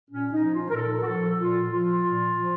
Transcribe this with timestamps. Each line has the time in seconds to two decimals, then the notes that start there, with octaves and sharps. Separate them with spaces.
0.10 A#2 C#4
0.32 D#4
0.43 F3
0.53 F4
0.70 A#4
0.74 A#2 A4
1.02 F#4
1.06 F3 A4
1.39 A#2 F4
1.71 F3 F4
2.04 A#2
2.36 F3